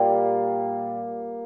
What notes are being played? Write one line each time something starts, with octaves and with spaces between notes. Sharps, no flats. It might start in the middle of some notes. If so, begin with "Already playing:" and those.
Already playing: A#2 G3 A#3